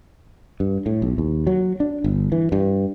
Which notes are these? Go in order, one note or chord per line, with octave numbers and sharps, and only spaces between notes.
G2
A2
B1
D#2
F#3
D4
G1
E3
G2